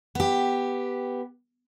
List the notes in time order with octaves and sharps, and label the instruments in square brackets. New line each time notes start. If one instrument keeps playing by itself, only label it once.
[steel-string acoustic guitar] B3 G4